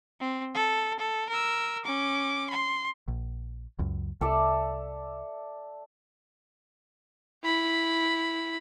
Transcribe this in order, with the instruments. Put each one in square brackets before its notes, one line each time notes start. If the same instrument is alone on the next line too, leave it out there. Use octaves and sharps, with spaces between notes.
[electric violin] C4
A4
A4
A#4 E6
C#4 D6
C6
[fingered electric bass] A#1
C#2 F#2
[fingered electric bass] C2 [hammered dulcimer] A4 D5 E5
[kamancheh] E4 B5